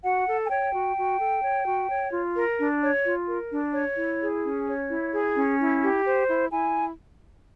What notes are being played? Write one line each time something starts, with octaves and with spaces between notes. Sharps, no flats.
F#4 F#5
A4
G#5
C#5 G5
F#4
F#4
A4
C#5
F#4
C#5
F4
A#4
D4
C#5
F4
A#4
D4
C#5
E4
G#4
C#4
C#5
E4
G#4
C#4
E4
G4
C5
E4
E4 G#5